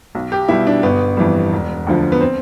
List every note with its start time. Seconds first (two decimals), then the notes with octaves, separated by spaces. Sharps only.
0.15 B1
0.32 G4
0.48 B2 G3 E4
0.67 D4
0.83 G1 B3
1.17 F2 E3 G3
1.52 E1
1.87 D2 D3 F3
2.12 B3
2.20 C4